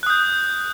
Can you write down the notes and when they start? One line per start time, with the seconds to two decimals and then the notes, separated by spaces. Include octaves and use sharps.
0.03 F#6
0.06 D#6
0.10 G6